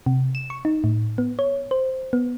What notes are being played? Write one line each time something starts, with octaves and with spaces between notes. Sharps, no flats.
C3
E7
C#6
D#4
A2
B3
C#5
C5
B3